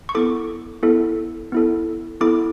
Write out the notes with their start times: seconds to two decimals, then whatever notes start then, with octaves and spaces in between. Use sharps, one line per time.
0.09 C#6
0.15 B3 E4 A4 D6
0.83 B3 E4 A4
1.52 B3 E4 A4
2.21 B3 E4 A4 D6